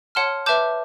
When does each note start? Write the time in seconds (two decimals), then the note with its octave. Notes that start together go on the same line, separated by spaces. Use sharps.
0.15 C#5 F#5 A5 C6 F6
0.46 B4 E5 A5 D6 G6